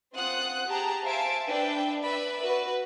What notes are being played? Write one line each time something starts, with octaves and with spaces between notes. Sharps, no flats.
C4 F4 F#5 D#6 F#6
G4 G#4 A5 A#5
C5 E5 F5 G#5 A5 D7
D4 B4 E5 G5
B4 D5 E5 B5
F#4 B4